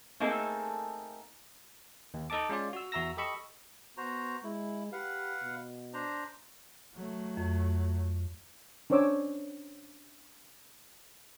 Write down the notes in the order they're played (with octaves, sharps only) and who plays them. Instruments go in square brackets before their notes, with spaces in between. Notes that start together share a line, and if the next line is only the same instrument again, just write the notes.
[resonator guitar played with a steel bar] A3 A#3 C4 D#4 G#4 A4
[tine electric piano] D#2
D#4 A4 D#5 A5 D6
G#3 C#4 F4 D5
F#4 E6
E2 F#4 E5 A#5 E6 A#6
G4 A4 D#5 B5 C#6 E6
[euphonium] B3 [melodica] F#4 C5 A#5
[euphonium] G#3 [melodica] E4
[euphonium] G4 [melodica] B4 F5 F#5
[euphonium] B2
[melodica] D4 C5 A#5
[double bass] F#3 A3
[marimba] F2
[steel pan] C#4 D4 C5 C#5 D6 E6